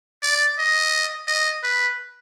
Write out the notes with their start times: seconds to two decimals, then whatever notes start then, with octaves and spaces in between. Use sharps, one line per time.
0.23 D5
0.58 D#5
1.27 D#5
1.63 B4